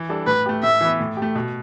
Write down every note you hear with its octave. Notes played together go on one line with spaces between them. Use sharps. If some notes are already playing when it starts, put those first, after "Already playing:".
Already playing: E3
G3 D4 A4
A2 B4
A3 G4
A2 E5
E3 B3
A2
G4
A3
B2